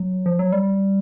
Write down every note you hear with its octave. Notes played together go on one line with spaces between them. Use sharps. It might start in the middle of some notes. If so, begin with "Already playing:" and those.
Already playing: F#3
F3
F#3
G3